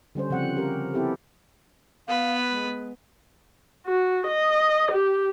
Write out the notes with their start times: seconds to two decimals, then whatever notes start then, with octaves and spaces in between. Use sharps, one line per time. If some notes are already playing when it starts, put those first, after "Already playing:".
0.15 D3 G3 C#4 C5
0.30 C#3 F3 C4 F#5
0.57 C#4 G4 A#4
0.94 B3 C4 E4 G4 A4
2.08 B3 B4 F5
2.50 G#3
3.86 F#4
4.28 D#5
4.92 G4